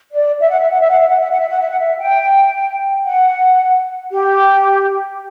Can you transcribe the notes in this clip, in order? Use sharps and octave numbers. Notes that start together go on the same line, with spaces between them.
D5
E5
F#5
E5
F#5
E5
F#5
E5
F#5
E5
F#5
E5
F#5
E5
F#5
E5
G5
F#5
G4